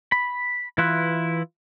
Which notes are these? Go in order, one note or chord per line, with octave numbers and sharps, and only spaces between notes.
B5
E3 E4 F4 B4